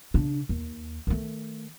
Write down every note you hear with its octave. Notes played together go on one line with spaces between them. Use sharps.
C#3 D4
D#2
D#3 A3